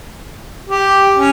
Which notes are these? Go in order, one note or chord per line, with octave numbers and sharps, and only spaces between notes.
G4
C#4